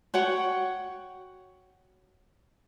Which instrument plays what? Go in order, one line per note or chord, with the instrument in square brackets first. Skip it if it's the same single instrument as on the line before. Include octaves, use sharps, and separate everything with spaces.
[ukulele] F#4 C#5 F#5 G5